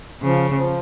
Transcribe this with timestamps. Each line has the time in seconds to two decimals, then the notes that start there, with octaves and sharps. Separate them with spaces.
0.22 C#3 F3
0.56 F3